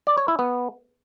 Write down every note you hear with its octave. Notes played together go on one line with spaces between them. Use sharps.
D5
C#5
E4
B3